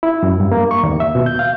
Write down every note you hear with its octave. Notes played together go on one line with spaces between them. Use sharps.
E4
F#2
G2
A#3
C#6
D#2
E5
B2
G6
F5